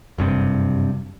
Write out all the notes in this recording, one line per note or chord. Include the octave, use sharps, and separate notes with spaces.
F#1 G2 C3